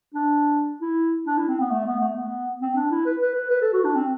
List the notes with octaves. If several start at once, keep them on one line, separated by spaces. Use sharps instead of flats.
D4
E4
D4
E4
C4
B3
A3
B3
A3
B3
C4
D4
E4
B4
B4
B4
B4
A4
F#4
D4
C4